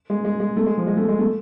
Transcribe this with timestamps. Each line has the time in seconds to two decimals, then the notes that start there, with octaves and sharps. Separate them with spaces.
0.10 G#3
0.24 G#3
0.40 G#3
0.57 A3
0.66 G#3
0.77 F3
0.87 G#3
0.97 A3
1.09 G#3
1.19 A3